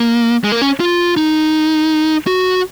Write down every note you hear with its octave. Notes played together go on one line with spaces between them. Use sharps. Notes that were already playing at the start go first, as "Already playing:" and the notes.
Already playing: A#3
G#3
A#3
C#4
F4
D#4
F#4